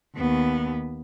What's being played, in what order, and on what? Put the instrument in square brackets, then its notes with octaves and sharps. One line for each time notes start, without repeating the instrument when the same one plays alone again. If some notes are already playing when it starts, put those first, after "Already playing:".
[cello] D#2 B3